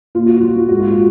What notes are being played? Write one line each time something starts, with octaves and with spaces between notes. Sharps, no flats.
A#2 F4
F#4
F4
F#3
F#4
F4
G#2 F#4
F4
F#4